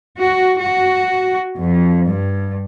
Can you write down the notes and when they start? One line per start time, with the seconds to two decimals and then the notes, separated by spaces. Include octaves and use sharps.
0.18 F#4
0.62 F#4
1.58 F2
2.09 G2